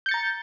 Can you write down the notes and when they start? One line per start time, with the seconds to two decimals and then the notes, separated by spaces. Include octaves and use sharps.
0.06 G6
0.09 C#7
0.11 A6
0.14 A#5